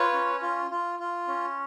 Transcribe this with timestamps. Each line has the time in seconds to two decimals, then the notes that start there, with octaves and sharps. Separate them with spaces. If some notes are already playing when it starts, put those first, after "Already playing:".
Already playing: F4 B4 C#5
0.13 C#4
0.42 F4
0.71 F4
0.99 F4
1.28 C#4